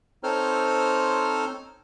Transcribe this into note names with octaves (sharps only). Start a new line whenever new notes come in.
C4 D#4 A4 C5 C#5 F6